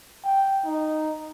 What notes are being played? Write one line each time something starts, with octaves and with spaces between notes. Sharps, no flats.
G5
D#4